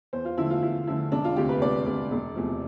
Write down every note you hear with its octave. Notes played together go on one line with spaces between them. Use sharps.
E2 C5
F4
D3 F3 A3 E4
F4
E2 E4
D3 F3 A3 E4
E1 D4
F4
D2 C3 G4
B4
E1 D5
D2 C3
E1
E2 C3 F3 A3